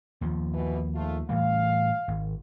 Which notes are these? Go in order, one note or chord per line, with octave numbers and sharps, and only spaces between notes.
D#2 F3
B2 E3
G#1 A3 F4
A2 E3 G3 F5
G#1